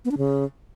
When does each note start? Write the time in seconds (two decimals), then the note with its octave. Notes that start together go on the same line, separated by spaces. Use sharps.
0.05 B3
0.11 D4
0.18 C#3